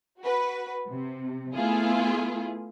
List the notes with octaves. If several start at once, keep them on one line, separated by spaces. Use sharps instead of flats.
F#4 B4
C3
A3 B3 E4 F4 G#4